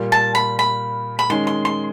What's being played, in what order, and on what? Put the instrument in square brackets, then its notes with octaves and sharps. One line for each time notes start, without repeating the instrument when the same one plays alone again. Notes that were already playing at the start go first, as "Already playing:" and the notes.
Already playing: [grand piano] A#2 G3 A#3
[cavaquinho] A5
B5
B5
B5
[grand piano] D#3 G#3 C#4 [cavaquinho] C6
[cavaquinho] C6
C6